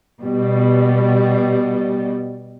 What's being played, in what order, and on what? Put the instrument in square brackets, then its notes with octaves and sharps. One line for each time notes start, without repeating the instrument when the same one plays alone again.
[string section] B2 G3